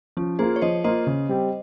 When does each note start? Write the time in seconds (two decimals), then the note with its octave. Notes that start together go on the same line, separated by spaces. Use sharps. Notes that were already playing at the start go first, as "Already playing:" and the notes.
0.17 F3 C#4
0.39 A#3 F4 G#4 C5
0.56 C#5
0.61 F3 C5 D#5
0.84 A#3 F4 C5 D#5
1.07 C#3
1.29 G3 C4 G4